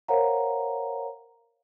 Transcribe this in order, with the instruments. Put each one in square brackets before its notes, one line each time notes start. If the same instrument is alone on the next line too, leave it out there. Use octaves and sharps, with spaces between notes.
[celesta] A#4 C5 C#5 F5 F#5 A#5